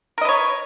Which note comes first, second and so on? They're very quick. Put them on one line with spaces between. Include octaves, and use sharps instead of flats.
A#4 D#5 B4 C#5